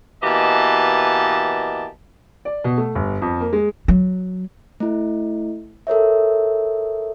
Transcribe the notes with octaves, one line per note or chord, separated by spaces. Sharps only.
B2 E3 A#3 G4 D#5 A5
D5
B2
A3
G1
F2
A#3
G#3
F#3
A3 E4
A4 A#4 C#5 E5